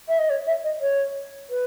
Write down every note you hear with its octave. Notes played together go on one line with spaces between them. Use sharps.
E5
D#5
C#5
E5
D#5
C#5
B4